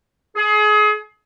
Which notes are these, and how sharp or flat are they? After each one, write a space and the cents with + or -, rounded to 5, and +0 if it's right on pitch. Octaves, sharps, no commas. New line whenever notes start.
G#4 +30